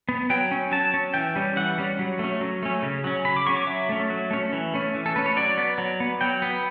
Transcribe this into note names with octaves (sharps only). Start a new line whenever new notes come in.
B3
F#3 G5
C#4
F#3 A5
C#4
E3 G5
G3 C#4
E3 F#5
G3 C#4
F#3
A3 C#4
F#3
A3 C#4
C#3
F#3 C#4
C#3 B5
D6
F#3 C#4 C#6
D6
F#3 E5
A3 C#4
F#3
A3 C#4
E3
A3 C#4
E3
A4
A3 C#4 B4
C#5
F#3 D5
B3
F#3
B3
F#3 G5
B3